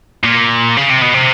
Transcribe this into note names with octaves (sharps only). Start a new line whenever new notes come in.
A#2
C#3
C3
B2
C3